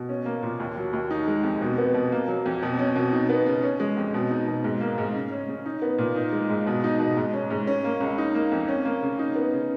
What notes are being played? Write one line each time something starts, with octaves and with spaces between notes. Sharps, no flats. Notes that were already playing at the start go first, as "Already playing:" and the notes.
Already playing: B2
C#4
A#3
A#2
D#2
F#3
D#2
D#4
G#3
F2
B2
B3
B2
A#3
F#3
F2
B2
C#4
B2
D#4
B3
C#3
C#4
G#3
F2
B2
D#4
B2
G#2
A#3
G#2
C#3
C#4
C#3
D#4
B3
A#2
D#4
G#3
G#2
B2
D#4
B2
G#2
C#4
G#2
C#4
A#3
C#2
D#4
A#3
F2
C#4
A#3
C#3
D#4
B3
C#3